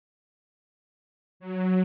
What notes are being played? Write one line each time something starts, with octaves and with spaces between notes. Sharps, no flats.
F#3